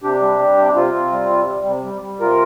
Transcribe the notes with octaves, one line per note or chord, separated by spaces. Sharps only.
C3 D4 G4
G3
G3
C3
C3 C4 F4
C3
G3
C3
G3
C3
G3
G3
C3 F4 A#4